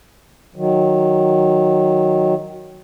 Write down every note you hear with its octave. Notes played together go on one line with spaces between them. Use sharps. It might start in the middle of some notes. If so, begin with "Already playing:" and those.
D#3 F#3